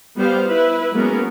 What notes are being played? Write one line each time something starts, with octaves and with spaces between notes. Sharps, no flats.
G3 B3 G4 C5 F5
E4 B4
F#3 G#3 A#3 B3 C#4 A#4